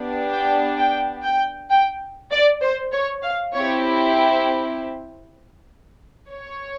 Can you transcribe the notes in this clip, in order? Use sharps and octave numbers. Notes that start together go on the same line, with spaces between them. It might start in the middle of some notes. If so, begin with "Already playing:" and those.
Already playing: B3 D4 G4
G5
G5
G5
G5
D5
C5
C#5
F5
C4 E4 G4 C#5
C#5